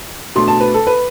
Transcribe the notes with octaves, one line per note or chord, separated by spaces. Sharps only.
B2 A3 D4 C6
A5
B4
A4
B4